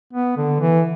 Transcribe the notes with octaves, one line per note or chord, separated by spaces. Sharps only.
B3
D3
E3